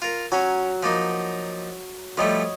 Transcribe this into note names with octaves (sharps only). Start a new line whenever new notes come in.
F4 A#4
F#3 C#4 G#5
F3 A#3 D#4
F3 G3 A3 C#5 D#5 B5